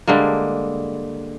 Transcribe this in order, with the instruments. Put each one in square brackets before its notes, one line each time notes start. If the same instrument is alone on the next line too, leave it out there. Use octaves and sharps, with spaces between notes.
[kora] D3 G3 G#3 A#3